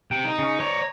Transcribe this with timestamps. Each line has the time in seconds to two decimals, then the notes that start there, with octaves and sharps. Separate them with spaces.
0.11 C3 G5
0.24 D#4
0.38 C#3 C#4
0.60 C#5 D5 A#5